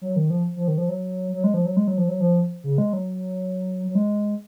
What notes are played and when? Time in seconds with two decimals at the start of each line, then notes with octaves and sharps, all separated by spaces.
0.01 F#3
0.16 D#3
0.30 F3
0.56 F3
0.68 D#3
0.78 F3
0.89 F#3
1.33 F#3
1.44 G#3
1.54 F3
1.66 F#3
1.77 G#3
1.88 F#3
1.98 F3
2.09 F#3
2.20 F3
2.64 C#3
2.78 G#3
2.93 F#3
3.88 F#3
3.95 G#3